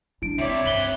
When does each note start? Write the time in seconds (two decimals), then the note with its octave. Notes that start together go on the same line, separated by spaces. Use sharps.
0.22 G3 D4 E4 D7
0.39 C#2 C3 C#5 D5 E5
0.66 G2 C4 B4 F#7 G7